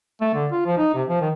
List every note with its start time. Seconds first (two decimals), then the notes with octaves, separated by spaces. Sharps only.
0.21 A3
0.34 D3
0.52 F4
0.66 F3
0.78 D#4
0.94 C3
1.09 F3
1.21 D#3